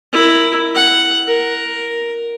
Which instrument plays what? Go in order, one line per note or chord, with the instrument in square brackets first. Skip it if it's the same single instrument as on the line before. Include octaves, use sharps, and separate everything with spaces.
[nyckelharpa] E4 A#4
F#5
A#4